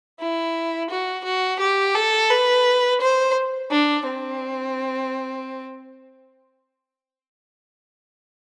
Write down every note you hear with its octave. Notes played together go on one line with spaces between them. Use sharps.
E4
F#4
F#4
G4
A4
B4
C5
D4
C4